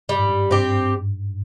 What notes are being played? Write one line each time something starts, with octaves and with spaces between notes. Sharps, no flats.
G2 G3
G#2
G2
G2 C4 G4